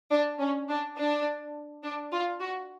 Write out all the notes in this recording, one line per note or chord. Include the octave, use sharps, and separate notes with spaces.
D4
C#4
D4
D4
D4
F4
F#4